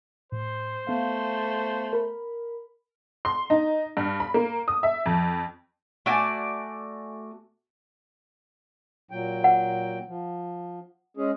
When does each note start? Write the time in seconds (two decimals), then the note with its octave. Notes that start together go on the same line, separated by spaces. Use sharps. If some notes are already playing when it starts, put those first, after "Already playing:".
0.32 A2 C5
0.87 A3 B3 F5
1.93 A#4 B5
3.25 C6
3.50 D#4
3.97 G2
4.20 B5
4.34 A#3
4.68 D#6
4.83 E5
5.06 F2
6.06 A3 F#4 D5 G#5
9.11 A#2 F#3 G5
9.44 F#5
10.08 F3
11.17 G#3 C#4 G#4